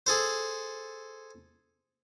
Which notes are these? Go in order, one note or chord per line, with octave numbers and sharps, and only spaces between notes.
G#4 A4 C5